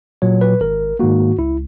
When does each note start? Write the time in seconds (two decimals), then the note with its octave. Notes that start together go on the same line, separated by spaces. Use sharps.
0.22 A#2 F#3 C#5
0.41 B4
0.61 G#1 A#4
0.99 G#2 D#3 A#3 F#4
1.38 C#2 E4